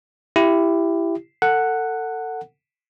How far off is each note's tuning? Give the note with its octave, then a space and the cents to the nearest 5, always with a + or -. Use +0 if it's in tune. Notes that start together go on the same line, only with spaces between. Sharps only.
E4 +15 G4 +0
A4 +30 F#5 +0